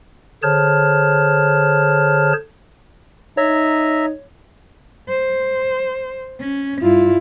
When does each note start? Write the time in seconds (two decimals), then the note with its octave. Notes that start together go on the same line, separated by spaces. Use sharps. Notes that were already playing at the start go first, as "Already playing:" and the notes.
0.43 D3 G#4 C5 C#5 A5 F6
3.37 D#4 C#5 E5 A#5
5.09 C5
6.40 C#4
6.82 G2 E4 F4